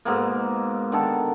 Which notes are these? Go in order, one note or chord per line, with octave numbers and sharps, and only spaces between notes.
G#2 B2 A#3
D3 D#3 A4